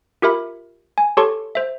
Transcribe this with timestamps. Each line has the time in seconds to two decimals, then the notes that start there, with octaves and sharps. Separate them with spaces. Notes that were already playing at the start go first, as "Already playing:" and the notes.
0.22 F4 G4 A#4 E5 B5
0.98 G#5
1.17 G4 A4 C#5 A5 C6 C#6
1.55 C5 E5